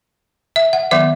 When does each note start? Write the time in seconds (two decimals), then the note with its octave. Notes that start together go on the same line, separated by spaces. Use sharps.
0.56 E5
0.73 F#5
0.91 D#3 F#3 B3 E5